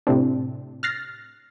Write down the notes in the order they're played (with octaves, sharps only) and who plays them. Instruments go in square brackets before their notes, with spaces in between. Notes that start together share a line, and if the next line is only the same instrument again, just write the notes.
[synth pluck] A2 C3 C4 D4
F6 F#6 A6 A#6 C7